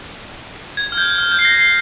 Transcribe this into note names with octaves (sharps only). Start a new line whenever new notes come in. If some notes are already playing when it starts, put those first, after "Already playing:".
G#6
F6
G6
F6
G6
C7
A#6
C7